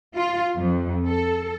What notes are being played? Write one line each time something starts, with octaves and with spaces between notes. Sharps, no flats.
F4
F2
A4